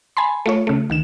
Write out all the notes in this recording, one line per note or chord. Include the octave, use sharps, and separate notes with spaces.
G#5 A5 B5 C6
A3 F4 C#5
C#3 A3
D2 D#3 E7